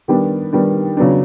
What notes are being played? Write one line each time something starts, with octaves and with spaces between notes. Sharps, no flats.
D#3 G3 B3 D4 G4
D#3 G3 B3 D4
C#3 F#3 B3 D4